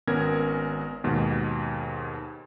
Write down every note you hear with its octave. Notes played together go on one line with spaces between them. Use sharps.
G#1 B3 C#4 A#4 G#6
D#2 G#2 B2